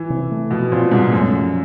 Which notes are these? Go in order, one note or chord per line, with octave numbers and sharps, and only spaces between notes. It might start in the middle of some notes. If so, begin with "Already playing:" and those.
Already playing: E3
C3
A3
B2 F3
A#2 C4
G#2 C3
F#2 A3
F3